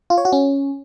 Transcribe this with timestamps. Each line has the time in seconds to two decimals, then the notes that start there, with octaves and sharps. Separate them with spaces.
0.10 F4
0.18 C#5
0.25 F#4
0.33 C#4